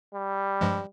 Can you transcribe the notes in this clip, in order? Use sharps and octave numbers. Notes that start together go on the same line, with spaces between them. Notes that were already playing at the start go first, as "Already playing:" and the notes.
G3
G2 F3 G#3